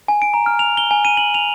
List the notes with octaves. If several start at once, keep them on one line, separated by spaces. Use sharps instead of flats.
G#5
D7
A#5
F6
F7
G7
G#5
D#7
F#7
F7